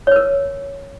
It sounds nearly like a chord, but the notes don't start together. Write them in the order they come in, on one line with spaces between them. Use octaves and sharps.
C#5 B4 A#4